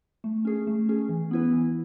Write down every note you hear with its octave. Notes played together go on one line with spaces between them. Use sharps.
A3
C#4 G#4
A3
C#4 G#4
E3
B3 E4 B4
E3